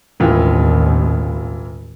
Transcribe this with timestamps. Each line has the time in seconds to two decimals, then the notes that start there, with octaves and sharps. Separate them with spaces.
0.20 E1 A1 D#2 E3 F4